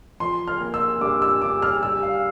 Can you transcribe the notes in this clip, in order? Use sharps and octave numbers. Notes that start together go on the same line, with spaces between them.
F3 C6
F6
A#3
E6
G2 D6
E6
G2 D6
F6
G3 E6
F5